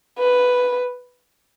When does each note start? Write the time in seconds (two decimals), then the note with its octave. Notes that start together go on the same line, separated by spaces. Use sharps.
0.19 B4